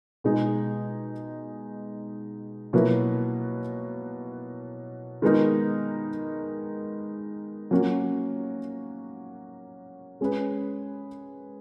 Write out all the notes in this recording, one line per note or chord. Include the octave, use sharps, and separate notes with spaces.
B2 G#3 D#4 G#4
B2 F#3 A#3 E4 B4
D#3 G#3 B3 D#4 A#4
F#3 A#3 C#4 F#4
G#3 C#4 G#4 B4